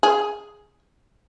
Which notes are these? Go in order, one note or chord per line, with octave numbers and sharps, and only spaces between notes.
G#4